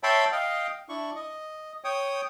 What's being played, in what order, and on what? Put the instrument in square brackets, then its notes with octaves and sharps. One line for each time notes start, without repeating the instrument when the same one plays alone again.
[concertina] C#5 E5 G5 A5 B5 C6
D#5 F5 G5
D4 E4 C#6
D#5
C#5 G5 D#6